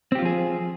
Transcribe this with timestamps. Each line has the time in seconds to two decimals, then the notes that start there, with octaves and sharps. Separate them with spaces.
0.12 C4
0.15 G4
0.19 F4
0.22 F3
0.25 G#4